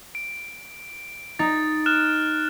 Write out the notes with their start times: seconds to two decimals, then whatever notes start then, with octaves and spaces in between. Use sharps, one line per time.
0.15 D7
1.39 D#4 A6
1.86 F6 F#6 E7